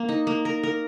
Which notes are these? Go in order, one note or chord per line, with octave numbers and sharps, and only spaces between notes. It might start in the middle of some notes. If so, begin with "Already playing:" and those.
Already playing: A#3
D#4
A#3
A#4
A#4